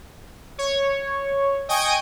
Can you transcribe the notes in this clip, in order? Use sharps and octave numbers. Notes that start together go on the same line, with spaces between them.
C#5
D#5 G5 G#5 C#6 D#6